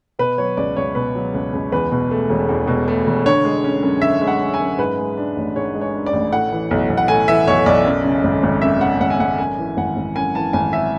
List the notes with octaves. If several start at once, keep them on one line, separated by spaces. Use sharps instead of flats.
B2 B4
F#3 C#5
C#2 D5
C#2 C#5
B2 B4
F#3
C#2
C#2
E2 B4
B2
A3
E1
E2
B2
A3
E1
D3 C#5
G#3
C#4
F#2
D3 E5
G#3
F#5
C#4
G#5
F#2
G#2 B4
G#3
D4
A1
G#2 C#5
G#3
C#5
D4
D5
A1
A2 F#5
E3
B1
B1
F#5
A2 G#5
E3 E5
B1 C#5
B1 D5
F#2
C#3
G#1
G#1
F#2 E5
C#3 F#5
G#1 F#5
G#5
G#1 F#5
F#2 G#5
E3
G#1 F#5
G#1
F#2 G#5
E3 A5
G#1 G#5
E5